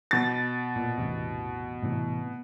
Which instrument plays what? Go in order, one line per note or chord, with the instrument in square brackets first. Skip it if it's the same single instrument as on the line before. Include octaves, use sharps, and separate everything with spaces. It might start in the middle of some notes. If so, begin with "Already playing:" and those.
[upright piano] B2 A6
[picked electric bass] A#2
A1 E2 C3
A2 C3 E3